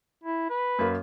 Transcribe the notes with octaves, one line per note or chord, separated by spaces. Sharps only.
E4
B4
F#2 A#3